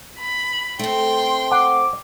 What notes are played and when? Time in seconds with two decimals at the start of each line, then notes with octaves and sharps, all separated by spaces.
0.18 B5
0.79 A3 C4 G5 C6
1.51 F#5 D6